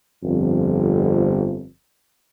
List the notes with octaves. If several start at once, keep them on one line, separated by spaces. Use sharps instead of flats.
G1 F2